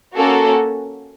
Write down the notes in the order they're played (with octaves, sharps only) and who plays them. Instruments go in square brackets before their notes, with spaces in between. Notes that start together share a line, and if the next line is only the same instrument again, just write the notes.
[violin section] A#3 C#4 F#4 A4